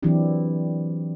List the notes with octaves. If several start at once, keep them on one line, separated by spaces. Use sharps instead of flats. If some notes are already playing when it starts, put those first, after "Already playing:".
E3 F#3 C4 D4 E4 G4